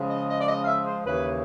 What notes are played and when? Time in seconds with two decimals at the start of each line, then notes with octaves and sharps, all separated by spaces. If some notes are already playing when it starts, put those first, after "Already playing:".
Already playing: C#3 F3 G#3
0.09 D#5
0.29 D#5
0.41 D5
0.48 D#5
0.63 F5
0.67 E5
0.86 C5
1.06 D#2 C#3 E3 B4